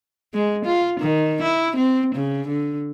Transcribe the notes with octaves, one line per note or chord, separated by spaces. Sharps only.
G#3
F4
D#3
E4
C4
C#3
D3